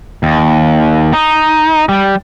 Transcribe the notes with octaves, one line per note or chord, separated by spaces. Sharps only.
D#2
D#4
G3